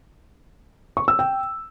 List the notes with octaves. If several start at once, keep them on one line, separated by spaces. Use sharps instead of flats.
C#6
E6
G5